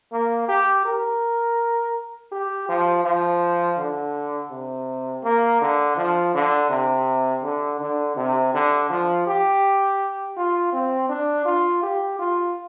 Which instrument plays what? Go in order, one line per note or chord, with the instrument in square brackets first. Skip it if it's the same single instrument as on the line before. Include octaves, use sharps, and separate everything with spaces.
[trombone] A#3
G4
A#4
G4
F3
F3
D3
C3
A#3
D3
F3
D3
C3
D3
D3
C3
D3
F3
G4
F4
C4
D4
F4
G4
F4